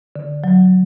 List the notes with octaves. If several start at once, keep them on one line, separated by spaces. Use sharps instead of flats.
D3
F#3